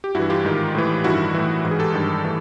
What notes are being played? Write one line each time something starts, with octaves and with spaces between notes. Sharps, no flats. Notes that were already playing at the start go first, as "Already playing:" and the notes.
G4
G2 E3 E4 F#4
F4 G4
G#2 D#3
A2 E3
G2 D#3 E4 F#4
A2 E3
G#2 E3
G#4
G4 A4
G2 D#3
A2 E3